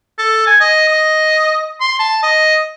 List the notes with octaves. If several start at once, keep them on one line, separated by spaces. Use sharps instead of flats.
A4
G#5
D#5
D#5
C6
A5
D#5